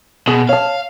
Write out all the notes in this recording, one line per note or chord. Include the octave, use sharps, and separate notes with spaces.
B2 G#4
C#5 F5 A5